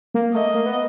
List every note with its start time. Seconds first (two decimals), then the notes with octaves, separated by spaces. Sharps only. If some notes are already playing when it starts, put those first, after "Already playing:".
0.14 A#3
0.34 A3 D#5
0.54 A#3
0.66 B3